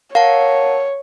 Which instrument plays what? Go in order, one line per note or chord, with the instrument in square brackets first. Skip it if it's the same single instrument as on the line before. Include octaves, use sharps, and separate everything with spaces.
[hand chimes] A#4 F#5 A5 [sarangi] C#5 [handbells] F5